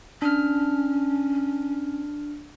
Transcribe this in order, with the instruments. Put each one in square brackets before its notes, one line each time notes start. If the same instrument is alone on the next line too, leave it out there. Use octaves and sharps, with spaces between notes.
[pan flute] C#4 [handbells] D4 F6